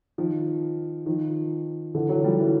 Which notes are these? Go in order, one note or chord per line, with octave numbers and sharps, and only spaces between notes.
D#3 F3
D#3 F3
D3 E3
E3 F#3
F3 G3
E3 F#3